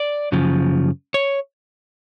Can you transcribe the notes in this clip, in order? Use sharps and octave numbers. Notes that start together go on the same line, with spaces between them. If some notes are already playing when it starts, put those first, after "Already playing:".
Already playing: D5
F#2 C#3 F3
C#5